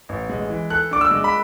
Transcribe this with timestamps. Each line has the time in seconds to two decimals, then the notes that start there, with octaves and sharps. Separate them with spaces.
0.09 A1
0.29 G#3
0.50 E3
0.70 A4 F#6
0.91 D4 D6
1.01 E6
1.11 G#3
1.24 B5